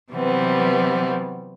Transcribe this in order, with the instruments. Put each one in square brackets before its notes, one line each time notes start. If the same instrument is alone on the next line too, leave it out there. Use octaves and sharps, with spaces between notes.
[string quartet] C3 E3 F#3 G3 B3 C4